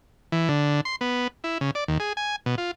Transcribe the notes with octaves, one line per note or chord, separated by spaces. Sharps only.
E3
D3
C6
B3
E4
C#3
D5
D#2
G#4
G#5
B2
F4